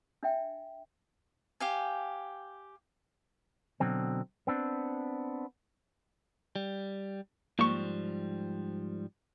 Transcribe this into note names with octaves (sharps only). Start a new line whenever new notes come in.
D4 E5 G5
G4 F5 G#5
B2 D3 F#3 C4
B3 C4 D4
G3
G#2 F3 G3 A#3 C#6